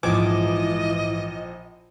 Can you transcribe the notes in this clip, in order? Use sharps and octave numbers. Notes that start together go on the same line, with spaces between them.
A#1 G#2 E3 F3 D#5 D6 G#6